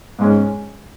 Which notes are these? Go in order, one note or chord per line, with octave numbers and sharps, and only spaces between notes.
G#2 G#3 C#4